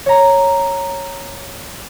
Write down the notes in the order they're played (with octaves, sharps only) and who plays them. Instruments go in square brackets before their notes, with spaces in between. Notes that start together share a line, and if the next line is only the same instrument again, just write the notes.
[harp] C#5 A#5